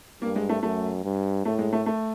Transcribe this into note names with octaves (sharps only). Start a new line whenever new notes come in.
G2 A#3
G#3
A3
F#2 A3
G2
A2 A3
G#3
A3
A3